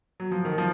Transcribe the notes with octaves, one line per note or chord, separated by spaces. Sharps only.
F#3
F3
D#3
F3